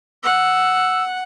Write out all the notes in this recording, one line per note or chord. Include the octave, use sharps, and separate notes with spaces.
F#5 E6